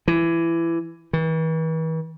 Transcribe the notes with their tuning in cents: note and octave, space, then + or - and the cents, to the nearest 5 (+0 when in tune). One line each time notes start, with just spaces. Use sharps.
E3 +20
E3 -40